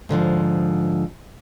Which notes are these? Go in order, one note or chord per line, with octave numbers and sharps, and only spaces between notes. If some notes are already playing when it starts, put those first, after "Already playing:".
G#2 D3 E3 F3